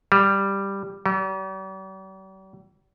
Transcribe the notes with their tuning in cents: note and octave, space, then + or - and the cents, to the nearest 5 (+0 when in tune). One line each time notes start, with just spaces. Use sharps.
G3 +5
G3 -45